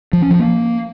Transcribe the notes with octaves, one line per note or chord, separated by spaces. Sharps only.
F3
C#4
F3
A#3